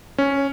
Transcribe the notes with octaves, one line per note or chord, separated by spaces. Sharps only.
C#4